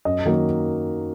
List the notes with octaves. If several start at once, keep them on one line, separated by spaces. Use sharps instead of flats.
F#2 D#5
D#3 F#3 A#3